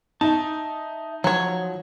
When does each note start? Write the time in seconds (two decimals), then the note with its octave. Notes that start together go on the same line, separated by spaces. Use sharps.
0.21 D#4 E5 A5
1.24 F3 F#3 C#5